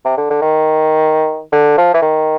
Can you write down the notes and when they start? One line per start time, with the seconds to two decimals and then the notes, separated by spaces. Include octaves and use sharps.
0.05 C3
0.17 D3
0.30 D3
0.42 D#3
1.52 D3
1.78 F3
1.94 E3
2.02 D#3